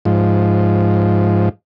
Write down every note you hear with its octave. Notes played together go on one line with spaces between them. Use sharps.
G#2 F3